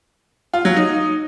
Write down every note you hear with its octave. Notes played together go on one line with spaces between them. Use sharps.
F4
F#3
D#4